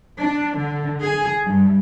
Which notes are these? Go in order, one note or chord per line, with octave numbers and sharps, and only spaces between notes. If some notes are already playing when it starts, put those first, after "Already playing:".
D4
D3
G#4
G2